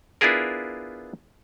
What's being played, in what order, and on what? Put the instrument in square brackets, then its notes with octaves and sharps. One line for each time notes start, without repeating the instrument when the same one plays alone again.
[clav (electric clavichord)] B3 D4 E4 F4 G#4 A#4